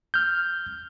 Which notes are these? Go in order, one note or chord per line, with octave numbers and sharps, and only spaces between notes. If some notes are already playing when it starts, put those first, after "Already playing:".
F6 G6